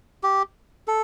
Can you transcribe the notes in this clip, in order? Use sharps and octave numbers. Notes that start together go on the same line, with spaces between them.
G4
A4